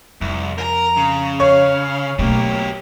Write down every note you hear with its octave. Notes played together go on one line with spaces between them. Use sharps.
C2 F2
A#4 A#5
C#3
C#5 F5
B1 B2 A3 A#3 G4